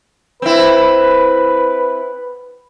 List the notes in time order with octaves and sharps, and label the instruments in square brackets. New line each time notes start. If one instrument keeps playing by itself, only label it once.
[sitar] C4 E4 [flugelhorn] B4